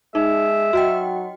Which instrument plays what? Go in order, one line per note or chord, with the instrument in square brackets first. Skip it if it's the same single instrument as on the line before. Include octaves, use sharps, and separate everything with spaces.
[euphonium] G#3 [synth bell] D#4 [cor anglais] E5
[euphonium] F#3 [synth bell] F#4 D#5 G5